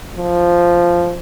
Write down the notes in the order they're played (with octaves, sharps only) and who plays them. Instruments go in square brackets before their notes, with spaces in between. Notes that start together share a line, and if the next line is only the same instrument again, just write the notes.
[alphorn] F3